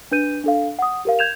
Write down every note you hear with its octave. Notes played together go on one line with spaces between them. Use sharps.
D4 B4 G6 D#7
D4 A4 F5
F#5 D#6
G4 A#4 F5
G6 G#6 E7 F7